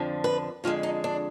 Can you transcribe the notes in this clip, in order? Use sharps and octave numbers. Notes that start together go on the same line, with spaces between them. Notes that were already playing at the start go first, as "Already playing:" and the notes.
Already playing: F2 D3 F3
B4
F2 D3 G#3 F4
D#4
D4